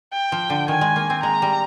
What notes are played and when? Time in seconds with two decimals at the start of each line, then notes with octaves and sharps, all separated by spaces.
0.13 G5
0.32 F3
0.50 D3
0.68 D#3 G#5
0.81 G#3
0.96 A#3
1.10 C4
1.23 G#3 A#5
1.42 G3